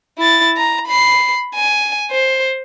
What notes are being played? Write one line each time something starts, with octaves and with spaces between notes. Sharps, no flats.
E4 A6
A#5
B5 C7
G#5
C5